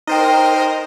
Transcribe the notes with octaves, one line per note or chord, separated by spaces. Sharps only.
D#4 A#4 C5 D#5 G5